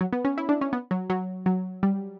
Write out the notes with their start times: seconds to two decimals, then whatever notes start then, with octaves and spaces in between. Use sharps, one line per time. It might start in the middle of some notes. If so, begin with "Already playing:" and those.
0.01 F#3
0.13 B3
0.25 C#4
0.38 E4
0.49 D4
0.61 C#4
0.73 B3
0.91 F#3
1.10 F#3
1.46 F#3
1.83 G3